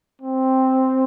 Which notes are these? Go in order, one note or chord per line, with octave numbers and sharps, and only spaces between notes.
C4